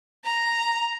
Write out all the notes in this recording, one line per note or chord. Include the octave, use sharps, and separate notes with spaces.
A#5